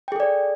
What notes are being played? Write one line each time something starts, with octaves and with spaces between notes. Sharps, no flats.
G#4 A4 D5 G5